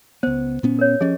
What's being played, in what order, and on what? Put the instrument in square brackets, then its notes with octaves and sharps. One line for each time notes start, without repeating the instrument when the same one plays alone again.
[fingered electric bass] C#2 B3 [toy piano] C5
[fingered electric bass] A#2 B3 C#4
[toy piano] A#4 C#5
[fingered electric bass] F3 C#4 [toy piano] G4 G#4 D#5